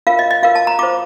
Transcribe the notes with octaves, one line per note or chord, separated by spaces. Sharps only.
F4 A#4 F5
D#5
D#5
F4 A#4 F5
A5
A#5
F4 C5 D6